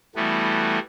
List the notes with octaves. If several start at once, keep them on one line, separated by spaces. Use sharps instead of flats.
E3 G3 A3 B3 F#4